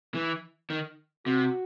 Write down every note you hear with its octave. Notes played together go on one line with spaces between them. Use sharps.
E3
D#3
C3 F#4